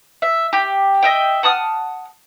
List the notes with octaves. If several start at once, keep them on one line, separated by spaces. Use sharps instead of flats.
E5
G4
D#5 E5 G5
F#5 A5 D#6 F6